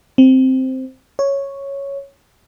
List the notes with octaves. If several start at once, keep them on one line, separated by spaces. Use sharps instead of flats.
C4
C#5